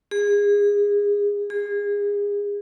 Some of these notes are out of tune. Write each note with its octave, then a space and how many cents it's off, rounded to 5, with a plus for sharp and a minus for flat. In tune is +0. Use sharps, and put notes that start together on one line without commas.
G#4 -25
G#4 -30